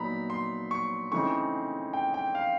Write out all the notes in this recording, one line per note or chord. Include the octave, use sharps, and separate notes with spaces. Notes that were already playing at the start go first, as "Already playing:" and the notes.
Already playing: A#2 F#3 B3 D#4 A#5 B5
C6
C#6
C#3 E3 A3 C4 D#4 C#6
G5
G5
F5